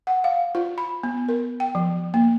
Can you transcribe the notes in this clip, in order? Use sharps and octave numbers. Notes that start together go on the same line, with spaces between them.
F#5
F5
F4
B5
B3
A#4
G5
F3
A#3